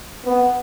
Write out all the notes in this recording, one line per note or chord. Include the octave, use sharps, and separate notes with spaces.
B3